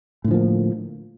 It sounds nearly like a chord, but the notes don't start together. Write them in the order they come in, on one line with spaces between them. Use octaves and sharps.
A2 D3 F3 A#3